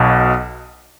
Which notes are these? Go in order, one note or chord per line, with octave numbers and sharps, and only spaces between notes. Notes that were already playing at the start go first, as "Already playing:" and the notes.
Already playing: B1 B2